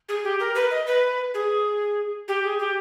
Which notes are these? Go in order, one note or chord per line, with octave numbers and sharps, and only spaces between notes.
G#4
G4
A#4
B4
D#5
B4
G#4
G4
G#4
G4